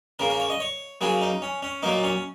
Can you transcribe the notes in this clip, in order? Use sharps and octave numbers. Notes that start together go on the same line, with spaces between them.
C#3 A#3 A#4
A#4
C#5
D#5
C#5
C#3 F#3 A#3 G#4
D#4
C#4
C#4
A#2 F#3 A#3 D#4
C#4